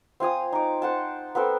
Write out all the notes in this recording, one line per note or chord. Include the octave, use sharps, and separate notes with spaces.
C4 F4 G#5 D#6
D#4 D6
C5 F#5 A5
B3 C4 A4 G5